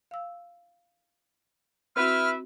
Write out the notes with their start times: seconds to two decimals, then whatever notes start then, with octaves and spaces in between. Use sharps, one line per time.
0.11 F5 E6
1.96 C4 E4 F#4 B4 E5 F6